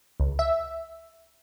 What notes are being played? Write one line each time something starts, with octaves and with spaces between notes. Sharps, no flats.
C#2
E5